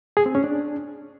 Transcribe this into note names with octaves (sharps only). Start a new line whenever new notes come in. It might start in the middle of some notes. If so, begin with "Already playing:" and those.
G#4
C4
C#4
D4